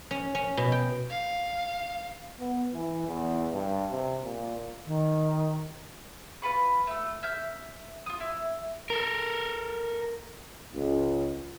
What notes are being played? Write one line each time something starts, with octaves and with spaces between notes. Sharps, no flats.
C#4
C#4
B2
G5
F5
B3
E3
E2
G2
C3
A#2
D#3
F4 B4 B5 C#6
A3 E6
E5 F6 G6
F4 D#6
E4
A4 A#4
C#2